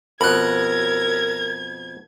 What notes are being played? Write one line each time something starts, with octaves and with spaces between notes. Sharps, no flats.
F2 B2 A#4 B5 F#6 G#6